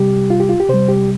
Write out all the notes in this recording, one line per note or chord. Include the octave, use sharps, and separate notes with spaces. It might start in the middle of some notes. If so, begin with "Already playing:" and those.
Already playing: C3 G3 G4
F4
G4
F4
G4
C3 G3 C5
G4